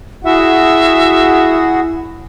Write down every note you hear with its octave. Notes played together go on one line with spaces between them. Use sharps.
E4 F#4 G#4 E5 F#5